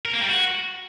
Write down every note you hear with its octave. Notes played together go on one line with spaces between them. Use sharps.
A#4
A#3
G3
F#4